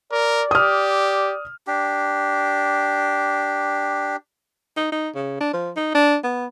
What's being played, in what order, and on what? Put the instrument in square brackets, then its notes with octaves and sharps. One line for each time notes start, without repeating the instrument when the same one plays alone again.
[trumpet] A#4 [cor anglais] D5
[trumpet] G4 [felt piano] D#6 F6
[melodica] D4 G4
[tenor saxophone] D#4
D#4
C#3
D4
F3
D#4
D4
B3